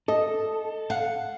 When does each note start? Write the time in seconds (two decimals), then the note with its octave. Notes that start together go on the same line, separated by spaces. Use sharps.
0.08 A4 D#5
0.90 F5 F#5